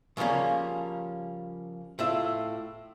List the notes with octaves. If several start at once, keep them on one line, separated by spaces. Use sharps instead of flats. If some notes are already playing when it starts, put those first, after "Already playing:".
C#3 F3 G3 A#3 C#4
A2 F4 E5